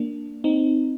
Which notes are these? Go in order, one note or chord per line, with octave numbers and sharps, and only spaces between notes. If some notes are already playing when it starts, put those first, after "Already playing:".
Already playing: A#3 D4
C4 D#4